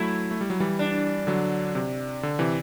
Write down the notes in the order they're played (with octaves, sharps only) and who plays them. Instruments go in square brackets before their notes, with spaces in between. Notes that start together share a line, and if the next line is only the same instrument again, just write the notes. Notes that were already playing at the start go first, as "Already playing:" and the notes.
Already playing: [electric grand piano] F#3 A3 [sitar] E4
[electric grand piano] A3
G3
F#3
E3 G3
[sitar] D4
[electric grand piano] D3 F#3
C3
D3
C3 E3